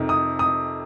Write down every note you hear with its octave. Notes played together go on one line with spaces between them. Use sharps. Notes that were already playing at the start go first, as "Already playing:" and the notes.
Already playing: F2 C3 D#3
D#6
D#6